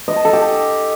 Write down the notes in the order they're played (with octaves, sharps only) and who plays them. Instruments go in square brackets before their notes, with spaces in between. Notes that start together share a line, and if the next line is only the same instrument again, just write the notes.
[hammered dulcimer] D#5
A5
A4
G4
A4